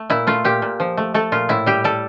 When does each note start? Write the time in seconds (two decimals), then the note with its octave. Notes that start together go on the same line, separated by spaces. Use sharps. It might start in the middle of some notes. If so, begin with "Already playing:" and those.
Already playing: A3
0.10 A#2 E4
0.27 A3 F4
0.44 A#2 G4
0.62 A#2
0.80 F3
0.97 A3
1.14 A3 A4
1.32 A#2 F4
1.49 A2 E4
1.66 G3 G4
1.84 G3 A4